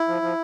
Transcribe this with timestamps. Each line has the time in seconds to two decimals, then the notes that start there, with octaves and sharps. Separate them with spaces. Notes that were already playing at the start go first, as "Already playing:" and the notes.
Already playing: E4
0.08 F3
0.22 F3